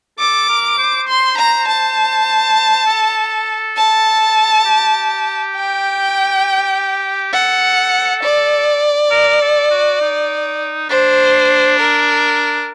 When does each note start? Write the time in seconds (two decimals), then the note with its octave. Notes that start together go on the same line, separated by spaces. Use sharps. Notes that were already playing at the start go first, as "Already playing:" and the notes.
0.19 A4 D6
0.49 A#4
0.78 C5
1.08 C6
1.38 A#5
1.68 A5
2.86 A4
3.76 A5
4.65 G4
5.55 G5
7.33 A4 F#5
8.23 D5
9.11 A#4
9.42 A4
9.71 F#4
10.01 D#4
10.89 D4 C5
11.79 A#4